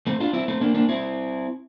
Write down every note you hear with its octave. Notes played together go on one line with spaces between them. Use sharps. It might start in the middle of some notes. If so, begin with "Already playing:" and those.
A3 C4
D4 F4
C4 E4
A3 C4
A#3 D4
A#3 D4
C4 E4